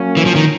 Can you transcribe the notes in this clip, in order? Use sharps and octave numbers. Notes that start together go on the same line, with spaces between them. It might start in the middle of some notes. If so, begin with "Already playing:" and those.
Already playing: F#3 A#3 C#4
E3
F3
D#3